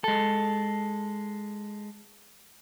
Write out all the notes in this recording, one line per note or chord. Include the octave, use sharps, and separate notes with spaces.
G#3 A4